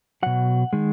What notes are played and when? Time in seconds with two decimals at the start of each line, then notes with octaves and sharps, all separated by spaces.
0.23 B2 F#3 F#5
0.73 D#3 G#3